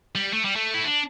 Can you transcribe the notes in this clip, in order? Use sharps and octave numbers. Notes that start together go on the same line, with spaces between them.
G3
A3
G3
A3
E4
D4